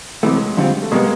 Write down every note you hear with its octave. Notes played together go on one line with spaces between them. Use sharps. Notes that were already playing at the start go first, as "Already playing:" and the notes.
C3 E3 F#3 G#3 A3
F2 D3 G3 C4 F4
A3
B2 G3 G#3 A#3 B3